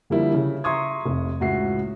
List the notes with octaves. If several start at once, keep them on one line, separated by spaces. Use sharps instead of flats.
D3 F3 G3 A#3 E4
C#3
E5 A#5 C6 C#6 D#6 G#6
F1
C#2 A2 F#4 E5 C7